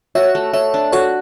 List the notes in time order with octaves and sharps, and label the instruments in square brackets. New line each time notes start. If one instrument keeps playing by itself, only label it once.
[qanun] F#4 [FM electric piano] C#5 E5
[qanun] A3
[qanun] A3 [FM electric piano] C#5 E5
[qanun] D4
[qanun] F#4 [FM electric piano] A4 C#5